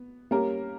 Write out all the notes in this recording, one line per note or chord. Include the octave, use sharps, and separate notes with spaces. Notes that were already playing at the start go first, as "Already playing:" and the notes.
Already playing: B3
G3 A#3 C#4 G4 A#4